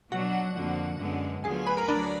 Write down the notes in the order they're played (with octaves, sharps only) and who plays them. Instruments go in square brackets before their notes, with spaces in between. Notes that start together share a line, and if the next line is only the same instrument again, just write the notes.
[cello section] B2 F#3 D4 [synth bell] F#4 F#5
[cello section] F2 D3 F3 A#3
F#2 D3 G#3 B3
[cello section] D2 D3 F#3 B3 F4 [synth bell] G#4 G#5
[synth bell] B4 B5
A#4 A#5
[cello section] D2 D3 F#3 [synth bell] D4 D5